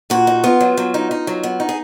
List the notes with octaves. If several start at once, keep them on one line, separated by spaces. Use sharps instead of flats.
A#2 F#4
D#4
B3 F4
F#3
F#3
D#4
D#4
F#3
B3
D#4
G#4